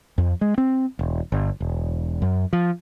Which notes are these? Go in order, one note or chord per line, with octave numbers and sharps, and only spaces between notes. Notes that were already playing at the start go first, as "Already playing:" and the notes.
F2
G#3
C4
E1
G1
E1
F#2
F3